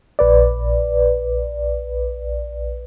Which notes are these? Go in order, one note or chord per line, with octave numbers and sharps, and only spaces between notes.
A#1 B4 D5